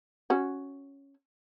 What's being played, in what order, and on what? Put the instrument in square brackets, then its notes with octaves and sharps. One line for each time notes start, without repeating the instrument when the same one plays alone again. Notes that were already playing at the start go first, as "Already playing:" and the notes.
[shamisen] C#4 F#4